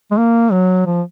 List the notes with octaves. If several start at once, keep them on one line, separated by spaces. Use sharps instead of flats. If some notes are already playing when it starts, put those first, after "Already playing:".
G#3
A#3
F#3
F3